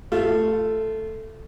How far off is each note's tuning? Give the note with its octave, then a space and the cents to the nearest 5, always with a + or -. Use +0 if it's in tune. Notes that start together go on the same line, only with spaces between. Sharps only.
A3 +0 F4 -15